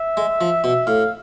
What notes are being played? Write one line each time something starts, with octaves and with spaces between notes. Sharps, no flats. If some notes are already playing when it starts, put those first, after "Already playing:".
Already playing: E5
G#3
F3
B2
A2 F5